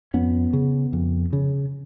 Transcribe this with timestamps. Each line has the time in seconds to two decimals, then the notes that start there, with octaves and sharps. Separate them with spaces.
0.14 F2 B3 C#4
0.53 C#3
0.93 F2
1.33 C#3